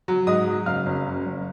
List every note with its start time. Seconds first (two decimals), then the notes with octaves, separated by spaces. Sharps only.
0.08 F#3
0.27 G#2 D#5 D#6
0.47 F#3
0.66 F#1 F5 F6
0.86 F#1
1.06 F#2
1.26 F#1